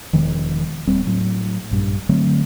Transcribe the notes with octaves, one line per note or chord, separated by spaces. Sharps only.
E1 D#3 F3 G#3
D#1 G3 C4
A2 F#3
A#1 G2
D3 F#3 A3 C4